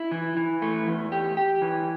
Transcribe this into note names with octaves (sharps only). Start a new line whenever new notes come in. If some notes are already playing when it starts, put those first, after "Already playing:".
Already playing: E4
E3
E3
A3
E2
G4
G4
E3